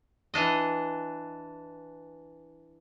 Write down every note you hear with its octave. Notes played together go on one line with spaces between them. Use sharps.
E3 D4 D#5